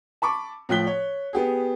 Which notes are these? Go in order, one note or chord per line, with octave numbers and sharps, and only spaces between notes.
A5 B5 C#6 D6
A2 F3 G5 F#6 B6 G7
C#5
B3 G4 G#4